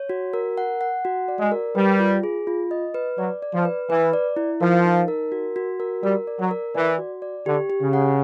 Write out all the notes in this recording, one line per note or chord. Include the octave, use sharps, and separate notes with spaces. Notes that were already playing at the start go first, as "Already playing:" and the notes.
Already playing: C#5
F#4
A#4
F#5
F#5
F#4
D5
G#3
A#4
G3 B4
F4
G#4
F4
D#5
B4
F#3 D5
D5
F3
B4
E3 B4
D5
E4
F3 A#4
D#4
A#4
F#4
F#4
A#4
G3 A#4
D5
F#3
A#4
E3 D5
F#4
D5
D3 G4
G4
C#3
F#5